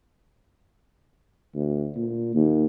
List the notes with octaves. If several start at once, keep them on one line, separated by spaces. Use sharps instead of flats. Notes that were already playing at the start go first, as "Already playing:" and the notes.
D2
A#2
D#2